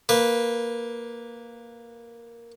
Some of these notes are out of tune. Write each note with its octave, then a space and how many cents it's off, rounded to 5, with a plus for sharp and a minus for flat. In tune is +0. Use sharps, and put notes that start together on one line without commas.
A#3 +0 B4 -5